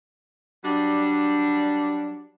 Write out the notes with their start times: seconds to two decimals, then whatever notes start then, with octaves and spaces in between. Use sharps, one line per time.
0.64 F#3 G3 D4